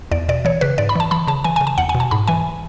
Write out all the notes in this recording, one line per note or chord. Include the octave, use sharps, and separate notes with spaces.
E2 D5
B2 D5
E3 C#5
C#3 B4
G#2 D5
B5
E3 A5
E3 B5
C#3 A5
E3 G#5
C#3 G#5
A5
E2 F#5
G#5
B2
A5
G#2 B5
E3 G#5